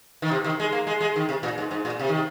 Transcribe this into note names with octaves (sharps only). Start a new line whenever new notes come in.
D#3
C3
D#3
G#3
A#3
G#3
G#3
D#3
C3
A#2
G#2
G#2
A#2
C3
D#3